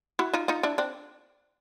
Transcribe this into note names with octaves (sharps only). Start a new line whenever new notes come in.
E4 F#4
D#4 F4
D#4 F4
D4 E4
C4 D4